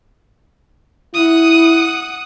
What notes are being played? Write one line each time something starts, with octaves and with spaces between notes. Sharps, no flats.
E4 F#5 D#6